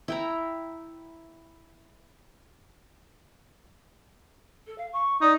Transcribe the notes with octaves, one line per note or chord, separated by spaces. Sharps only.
E4 G5 A#5
A4
F5
C#6
D#4 D5